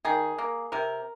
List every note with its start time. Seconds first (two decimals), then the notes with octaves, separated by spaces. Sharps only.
0.05 D#3 G#4
0.38 A#3
0.72 C3 A#4